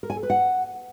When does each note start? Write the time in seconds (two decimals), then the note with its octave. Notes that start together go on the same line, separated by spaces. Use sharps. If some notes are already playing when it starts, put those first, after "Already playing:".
0.03 A#4
0.10 G#5
0.16 A4
0.23 B4
0.30 F#5